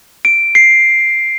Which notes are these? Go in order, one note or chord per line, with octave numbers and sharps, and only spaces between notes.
D7
C7